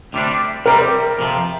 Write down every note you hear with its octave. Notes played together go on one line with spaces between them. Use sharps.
D2 C3 G3 D4
C3 G3 C4 A#4
F2 C3 F3